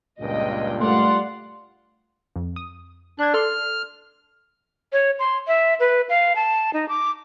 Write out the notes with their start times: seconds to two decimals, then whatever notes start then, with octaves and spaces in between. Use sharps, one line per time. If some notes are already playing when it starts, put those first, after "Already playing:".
0.20 C#2 G2 A#2 D#5 G5
0.81 G3 A3 F4 D5 F5 F#5 C6
2.36 F2
2.56 D#6
3.19 D4 F#6 G#6
3.34 A4 D5 C6 F6
4.93 C#5
5.19 C6
5.48 E5
5.80 B4
6.09 F5
6.36 A5
6.73 D#4
6.89 D6